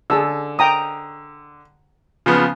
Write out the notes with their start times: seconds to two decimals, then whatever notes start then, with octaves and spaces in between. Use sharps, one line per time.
0.10 D3 G#4 A5 E6
0.59 G5 A#5 D#6
2.26 C#3 F3 B3